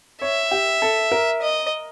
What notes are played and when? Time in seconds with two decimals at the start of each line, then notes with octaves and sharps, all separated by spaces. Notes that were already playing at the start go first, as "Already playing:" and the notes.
0.22 C#5 E5
0.51 G4
0.82 A4
1.12 A#4
1.42 D#5